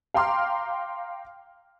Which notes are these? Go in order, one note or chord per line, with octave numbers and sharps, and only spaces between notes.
F5 G5 A#5 C6 D6 F6